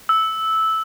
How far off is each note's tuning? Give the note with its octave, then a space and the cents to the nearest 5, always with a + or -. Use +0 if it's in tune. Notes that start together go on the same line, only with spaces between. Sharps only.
E6 -10